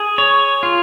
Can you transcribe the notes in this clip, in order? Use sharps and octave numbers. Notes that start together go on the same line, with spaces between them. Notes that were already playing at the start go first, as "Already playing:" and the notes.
Already playing: G#4
C#5
F4